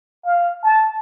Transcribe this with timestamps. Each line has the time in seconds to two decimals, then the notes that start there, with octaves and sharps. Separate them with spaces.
0.25 F5
0.64 A5